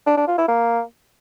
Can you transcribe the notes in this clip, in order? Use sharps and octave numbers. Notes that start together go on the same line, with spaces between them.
D4
D4
F4
E4
A#3